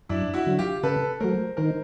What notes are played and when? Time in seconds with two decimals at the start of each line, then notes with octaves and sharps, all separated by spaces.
0.09 F#2 D4 E4
0.34 E4 F#4
0.46 D3 F#3
0.59 F4 G4
0.83 C#3 A4 B4
1.20 F#3 A3 A#4 C5
1.57 D#3 A#4 C5